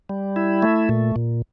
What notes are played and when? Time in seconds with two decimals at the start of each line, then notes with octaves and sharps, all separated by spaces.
0.09 G3
0.36 E4
0.62 A3
0.89 A#2
1.16 A#2